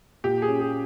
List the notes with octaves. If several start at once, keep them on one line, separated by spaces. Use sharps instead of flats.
A#2 G4
G#4
C#4
G#4